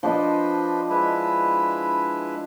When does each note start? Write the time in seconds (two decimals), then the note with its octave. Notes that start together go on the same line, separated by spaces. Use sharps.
0.03 F3 D4 B4 C5 D#5
0.90 G#3 E4 B4